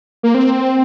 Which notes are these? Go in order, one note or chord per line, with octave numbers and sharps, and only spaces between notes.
A#3
C4